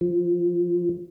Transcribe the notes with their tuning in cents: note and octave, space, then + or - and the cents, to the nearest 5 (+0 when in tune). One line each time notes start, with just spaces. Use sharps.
F3 +0